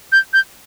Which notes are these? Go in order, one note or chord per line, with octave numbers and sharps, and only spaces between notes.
G6
G6